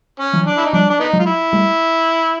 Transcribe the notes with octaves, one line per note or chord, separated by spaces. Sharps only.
C#4
E3 F#3
D4
E4
D#4
F3 G3 D4
D4
B3 D#4
F#3 G#3
F4
E4
G3 A3